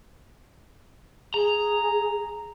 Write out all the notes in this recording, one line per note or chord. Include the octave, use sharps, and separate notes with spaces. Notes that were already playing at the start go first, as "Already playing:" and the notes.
G#4 A#5